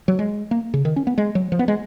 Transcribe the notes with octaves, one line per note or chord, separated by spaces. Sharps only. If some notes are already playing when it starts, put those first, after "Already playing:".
F#3
G#3
A#3
C#3
D#3
C#4
B3
G#3
F#3
F3
B3
G#3